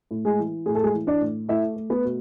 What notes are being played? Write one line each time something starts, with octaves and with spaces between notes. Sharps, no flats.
A2
G#3 G#4
E3
A2 G#4
A4
G#3 G#4
E3
D4 D5
A2
A3 E4 E5
A3
B3 B4
B2